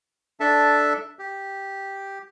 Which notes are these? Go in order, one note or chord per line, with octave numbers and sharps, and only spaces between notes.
D4 A4 E5 A5
G4